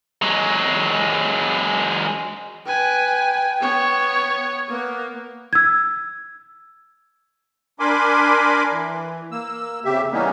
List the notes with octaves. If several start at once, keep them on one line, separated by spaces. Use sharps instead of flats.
F#3 G#3
B4 G5 G#5
B3 C#5
A#3 B3
E6 G#6
D4 A#4 G#5 B5 C6 D6
E3
A#3 E6
F2 C#3 G4 E5
E3 G3 A#3 B3 C#4 D#4